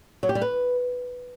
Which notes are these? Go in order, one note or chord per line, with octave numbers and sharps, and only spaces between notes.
F#3
G4
G3
B4